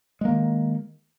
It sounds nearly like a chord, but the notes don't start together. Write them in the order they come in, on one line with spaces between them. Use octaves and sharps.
G#3 A#3 D#3